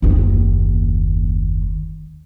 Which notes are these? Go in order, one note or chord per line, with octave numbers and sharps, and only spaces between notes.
F#1 D#2